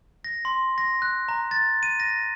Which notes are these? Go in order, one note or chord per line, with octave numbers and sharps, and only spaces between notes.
A#6
C6
A#6
F#6
A#5
A6
D#7
A#6